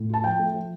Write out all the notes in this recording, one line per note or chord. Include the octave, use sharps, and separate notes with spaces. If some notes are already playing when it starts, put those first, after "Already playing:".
Already playing: A2
F4 A5
F3 G5
A3
F3